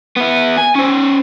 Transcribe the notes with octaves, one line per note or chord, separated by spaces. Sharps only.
B3 E4
G#5
C#4 C5